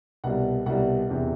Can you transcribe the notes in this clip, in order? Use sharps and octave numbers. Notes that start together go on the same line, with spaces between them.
C2 B2 G3 F#5
C2 B2 G3 F#5
E1 E2 C3